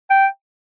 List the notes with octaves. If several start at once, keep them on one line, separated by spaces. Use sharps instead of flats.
G5